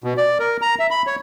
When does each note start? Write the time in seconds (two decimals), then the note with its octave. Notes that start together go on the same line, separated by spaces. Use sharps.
0.04 B2
0.17 D5
0.39 A#4
0.62 A#5
0.79 E5
0.91 B5
1.07 C#5